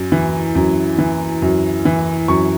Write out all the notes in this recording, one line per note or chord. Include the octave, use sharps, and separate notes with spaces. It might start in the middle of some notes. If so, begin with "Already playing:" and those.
Already playing: F#2
E3
F#2
E3
F#2
E3
F#2 C#6